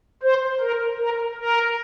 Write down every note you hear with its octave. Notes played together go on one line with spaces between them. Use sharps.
C5
A#4
A#4
A#4